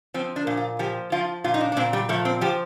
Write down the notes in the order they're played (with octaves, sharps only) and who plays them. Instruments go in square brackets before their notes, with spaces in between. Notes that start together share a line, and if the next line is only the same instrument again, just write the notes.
[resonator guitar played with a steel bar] F3 C4
D4
A#2
F4
F3 G4
F3 F4
A#2 F4
D#4
D4
D4
A#2 C4
G3
F3 A3
C4
F3 G4